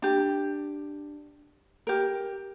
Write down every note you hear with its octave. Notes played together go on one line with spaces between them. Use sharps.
D4 G4
G4 A#4